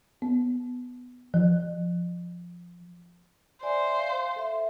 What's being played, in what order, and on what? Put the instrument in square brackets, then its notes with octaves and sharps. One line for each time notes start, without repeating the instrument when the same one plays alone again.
[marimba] B3
F3
[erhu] C5 [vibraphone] D5 E5 G#5
[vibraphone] F5
A4 E5